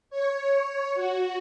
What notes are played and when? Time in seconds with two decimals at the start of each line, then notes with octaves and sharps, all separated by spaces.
0.10 C#5
0.94 F#4